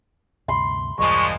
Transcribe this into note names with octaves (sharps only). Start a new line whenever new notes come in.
D2 G2 C3 B5 C6
B1 E2 G2 A#2 F3 G#3 C#6